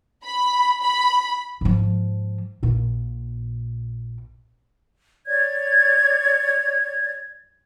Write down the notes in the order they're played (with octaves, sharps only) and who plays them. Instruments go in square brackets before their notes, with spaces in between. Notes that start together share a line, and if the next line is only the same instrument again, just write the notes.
[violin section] B5
B5
[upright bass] G#2 F3
A#1 A#2
[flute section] C#5 D5 G#6